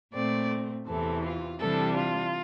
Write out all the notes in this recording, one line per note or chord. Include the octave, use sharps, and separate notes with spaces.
A#2 A3 C4 D5
E2 C3 E3 A4
F4
C3 E3 G3 D4 A4
F4